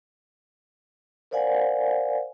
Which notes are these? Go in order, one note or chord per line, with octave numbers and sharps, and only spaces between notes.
A#4 C5 D5 F5 F#5 G#5